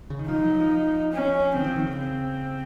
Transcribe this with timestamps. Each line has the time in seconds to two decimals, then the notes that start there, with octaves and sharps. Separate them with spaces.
0.10 C#3
0.19 D#3
0.28 F3 D#4
0.39 F#3
0.50 F#3
0.60 F3
1.13 C#4
1.55 C#3 C4
1.60 D#3
1.66 F3
1.76 D#3
1.87 C#3
1.97 C4